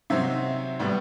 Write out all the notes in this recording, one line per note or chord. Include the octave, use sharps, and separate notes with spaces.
C3 F#3 C4 D#4 E5
A2 G3 B3